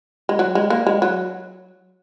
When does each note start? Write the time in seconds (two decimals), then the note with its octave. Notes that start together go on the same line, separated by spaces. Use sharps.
0.29 G#3
0.39 F#3
0.55 G#3
0.70 A#3
0.87 G#3
1.02 F#3